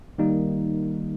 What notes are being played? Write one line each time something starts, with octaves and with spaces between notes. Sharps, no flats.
D#3 G3 A#3 D#4